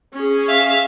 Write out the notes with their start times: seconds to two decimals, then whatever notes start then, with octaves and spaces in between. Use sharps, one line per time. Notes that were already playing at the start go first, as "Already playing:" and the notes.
0.14 C#4 G#4
0.48 E5 F5